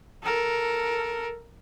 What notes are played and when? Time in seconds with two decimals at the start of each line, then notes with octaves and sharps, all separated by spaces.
0.23 A4 A#4